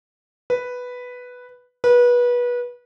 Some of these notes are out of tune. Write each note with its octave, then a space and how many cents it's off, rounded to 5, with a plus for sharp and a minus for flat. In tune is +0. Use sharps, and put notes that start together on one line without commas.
B4 +0
B4 -25